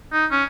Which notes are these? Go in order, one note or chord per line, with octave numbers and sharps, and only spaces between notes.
D#4
C#4